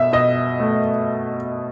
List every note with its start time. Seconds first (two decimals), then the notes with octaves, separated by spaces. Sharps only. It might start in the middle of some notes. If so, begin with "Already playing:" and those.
Already playing: B2 E5
0.13 B2 D#5
0.60 A3